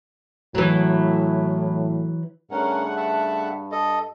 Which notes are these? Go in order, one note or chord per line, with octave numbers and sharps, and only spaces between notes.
A2 E3 F#3
G2 C#3 A3 C#4 A#4 F#5
E5 A5
A4 D#5